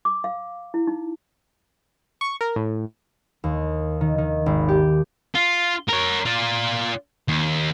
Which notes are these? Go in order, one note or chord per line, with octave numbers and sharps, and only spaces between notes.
D6
F5
E4
D#4
C#6
A#4
A2
D#2
D#3
D#3
G#1
G4
F4
A#4 C#5
F4 D5
D#2